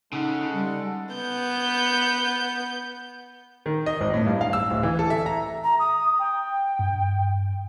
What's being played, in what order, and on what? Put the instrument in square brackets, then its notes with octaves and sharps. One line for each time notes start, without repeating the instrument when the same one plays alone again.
[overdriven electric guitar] C#3 [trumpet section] G#3 A4 F#5 [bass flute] D#4
[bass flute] G3
[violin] B3 G6
[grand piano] D#3
D#5
G#1
A2
G2
F5
E6
D1
E3
A4
E5
A#5
[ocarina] A#5
D#6
G5
[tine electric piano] G2